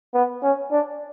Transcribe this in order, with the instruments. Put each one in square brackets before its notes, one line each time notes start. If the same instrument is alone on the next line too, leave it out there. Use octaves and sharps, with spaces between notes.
[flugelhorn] B3
C#4
D4